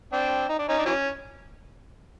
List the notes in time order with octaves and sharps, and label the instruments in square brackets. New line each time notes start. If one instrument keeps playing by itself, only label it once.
[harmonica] C4 D4
D#4
D4
C#4 D#4
D4
E3 F#3 C#4